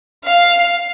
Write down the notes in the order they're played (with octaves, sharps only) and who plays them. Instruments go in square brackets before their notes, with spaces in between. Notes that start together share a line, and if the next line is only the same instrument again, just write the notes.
[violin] F5